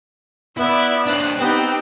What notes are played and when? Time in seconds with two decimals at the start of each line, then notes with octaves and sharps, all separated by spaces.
0.57 B3 E4 D5 E5
1.07 C4 D4 F#6
1.39 B3 C4 D#4 G4